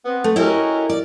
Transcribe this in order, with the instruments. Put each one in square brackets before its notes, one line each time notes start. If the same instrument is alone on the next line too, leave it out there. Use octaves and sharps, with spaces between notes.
[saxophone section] B3 C4
[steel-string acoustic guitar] A3
[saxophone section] C#4 F#4 A#4 [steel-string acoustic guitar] E4 G4 D#5
[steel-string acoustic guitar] D5